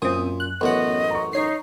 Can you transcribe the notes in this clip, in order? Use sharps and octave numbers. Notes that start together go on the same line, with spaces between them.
F#2 A#2 C4 D#6
F#6
A1 F#2 B3 D#5 F#5
A#5 C#6
D#4 C#5 C7